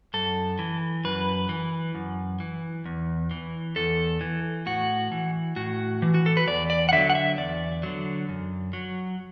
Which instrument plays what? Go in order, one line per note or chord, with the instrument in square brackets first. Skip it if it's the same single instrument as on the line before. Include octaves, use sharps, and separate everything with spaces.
[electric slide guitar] F#2 A4
E3
F#2 B4
E3
F#2
E3
E2
E3
E2 A4
E3
A2 F#4
E3
A2 F#4
E3
F#4
A4
B4
E2 D5
D5
F#5
D3 F#3 E5
F#5
E5
E2 D5
D3 F#3
F#2
F#3